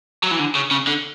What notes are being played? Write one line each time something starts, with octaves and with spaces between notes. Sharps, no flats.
F#3
E3
D3
C#3
C#3
D3